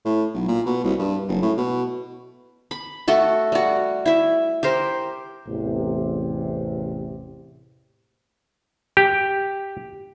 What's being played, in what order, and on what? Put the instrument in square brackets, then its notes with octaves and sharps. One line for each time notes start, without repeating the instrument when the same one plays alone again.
[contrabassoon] A2
B1
A#2
B2
C2
G2
F#1
A2
B2
[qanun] B5
A3 F#4 A4
G3 F#4
E4 E5
G4 A#4 C5
[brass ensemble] A1 E2 C3
[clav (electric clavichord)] G4